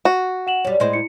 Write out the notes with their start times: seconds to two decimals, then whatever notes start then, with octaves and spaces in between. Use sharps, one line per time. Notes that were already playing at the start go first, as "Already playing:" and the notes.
0.05 F#4
0.47 F#5 E7 F#7
0.65 F#2 G3 C#5
0.80 A2 G#3 C5 D#5
0.93 E4 C#7